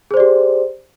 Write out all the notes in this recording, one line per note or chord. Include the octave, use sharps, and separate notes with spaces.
G4 G#4 C5 D5